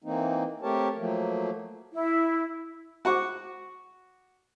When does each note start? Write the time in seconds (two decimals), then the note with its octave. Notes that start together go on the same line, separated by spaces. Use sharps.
0.04 E3 A#3 C4 D#4
0.62 A3 C4 G4 A#4 C#5 A5
0.97 F3 F#3 A3 A#3
1.93 E4
3.05 F#4 F#5 C#6 D6